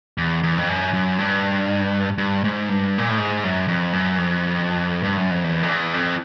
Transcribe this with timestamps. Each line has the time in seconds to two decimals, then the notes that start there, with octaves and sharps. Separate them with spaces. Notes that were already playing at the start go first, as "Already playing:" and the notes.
0.18 E2
0.43 E2
0.57 F2
0.69 F#2
0.93 F#2
1.19 G2
2.18 G2
2.44 G#2
2.69 G2
2.98 A#2
3.09 A2
3.18 G#2
3.44 F#2
3.68 F2
3.93 F#2
4.18 F2
5.03 G2
5.17 F#2
5.31 F2
5.44 E2
5.63 F2
5.69 E2
5.94 F2